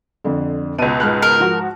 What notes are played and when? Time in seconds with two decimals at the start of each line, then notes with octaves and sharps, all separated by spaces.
0.24 F2 D3
0.79 C#2 B2 D#7
1.00 G#2 F6 F#6
1.22 A#4
1.40 F3 F#4